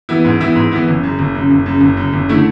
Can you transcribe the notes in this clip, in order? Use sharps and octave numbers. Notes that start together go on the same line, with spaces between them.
E3 B3 E4
G#2
E3 B3 E4
G#2
E3 B3 E4
F#1
F#2 C#3
F#1
F#2 C#3
F#1
F#2 C#3
F#1
F#2 C#3
F#1
D3 A3 E4